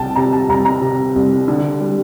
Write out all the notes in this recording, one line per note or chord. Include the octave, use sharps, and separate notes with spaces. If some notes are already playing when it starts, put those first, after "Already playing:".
Already playing: C2 C3 G5 A5
C3 A#5
A5
C2 A#5
A#5
C3
C2
D3
G3